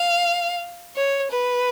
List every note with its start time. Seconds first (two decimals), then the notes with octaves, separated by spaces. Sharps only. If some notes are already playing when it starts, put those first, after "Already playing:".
Already playing: F5
0.96 C#5
1.31 B4